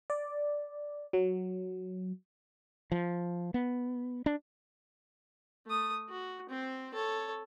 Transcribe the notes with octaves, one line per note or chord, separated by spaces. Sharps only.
D5
F#3
F3
B3
D4
A3 D#6
F#4
C4 C5
A4 C#5